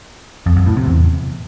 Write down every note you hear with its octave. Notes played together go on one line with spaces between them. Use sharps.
F2
F#2
A2
C3
E2